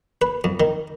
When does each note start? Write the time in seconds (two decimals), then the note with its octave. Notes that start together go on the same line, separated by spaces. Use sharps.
0.22 B4
0.44 F2
0.60 D#3